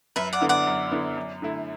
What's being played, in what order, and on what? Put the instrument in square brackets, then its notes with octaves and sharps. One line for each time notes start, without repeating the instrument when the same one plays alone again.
[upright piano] F#2 [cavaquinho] B4 E5
[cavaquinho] D5 F#5
[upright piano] D3 B3 E4
[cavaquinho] D5 F#5
[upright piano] F#2
D3 B3 E4
F#2
D3 A3 E4